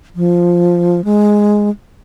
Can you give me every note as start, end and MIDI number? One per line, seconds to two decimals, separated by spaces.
0.16 1.04 53
1.05 1.70 56